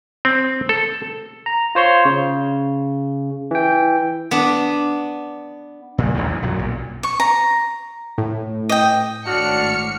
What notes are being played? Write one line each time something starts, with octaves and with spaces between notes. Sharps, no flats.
C4
A4
A#5
F4 C5 C#5 C6
C#3
E3 G5
B3 D4
A#2 C#3 G3
A1 E2 A2 D#3
D2 E3
B1 F#2 A#2 F#3
B1 A#2
C#6
A#5
A2
D#5 G5
G#1 A2 D4 F#4 F6 C#7